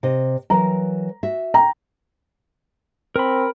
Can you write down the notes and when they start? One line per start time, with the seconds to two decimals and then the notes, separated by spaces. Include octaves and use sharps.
0.03 C3 D#5
0.50 E3 F#3 A#4 A#5
1.23 F#4 E5
1.54 G5 A#5
3.16 C4 A#4 B5